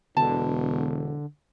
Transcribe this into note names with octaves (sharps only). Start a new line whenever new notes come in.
E1 B2 D3 A5